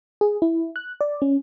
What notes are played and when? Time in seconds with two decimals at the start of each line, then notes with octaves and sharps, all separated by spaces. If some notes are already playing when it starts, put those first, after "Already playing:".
0.21 G#4
0.42 E4
0.76 F#6
1.01 D5
1.22 C#4